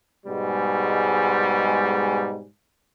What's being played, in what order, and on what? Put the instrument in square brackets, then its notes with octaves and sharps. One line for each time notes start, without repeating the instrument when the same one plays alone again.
[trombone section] G#2 B2 G3 G#3